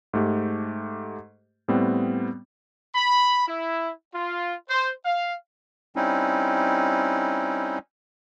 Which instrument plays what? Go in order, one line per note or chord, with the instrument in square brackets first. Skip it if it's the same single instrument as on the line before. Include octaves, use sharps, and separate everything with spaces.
[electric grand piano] G#2 A3 G4
A2 G3 B3 C4
[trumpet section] B5
E4
F4
C5
F5
[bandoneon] G3 C4 C#4 D#4 E4